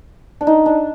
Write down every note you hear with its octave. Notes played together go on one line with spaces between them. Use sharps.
D4
D#4
D4